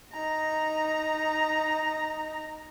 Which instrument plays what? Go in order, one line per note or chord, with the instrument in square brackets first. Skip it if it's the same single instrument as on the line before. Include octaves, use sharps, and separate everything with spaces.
[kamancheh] D#4 A#5